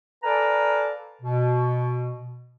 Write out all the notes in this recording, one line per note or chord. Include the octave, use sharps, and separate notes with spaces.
A4 B4 D5 F5 G#5 A#5
B2